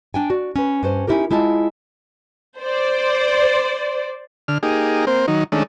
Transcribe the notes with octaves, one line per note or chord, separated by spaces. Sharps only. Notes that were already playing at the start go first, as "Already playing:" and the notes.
D4 G5 G#5
F#4 D5
C#4 B4
G2 C#4 C5
C#4 D#4 E4 F#4 G4 A#4
G#3 E4 F4 A5
C5 D5
D3 F6
A#3 D#4 G4 G#4
A#3 C4 C5
D#3 F#3 D#4
D#3 G#3 A3 C#4 D4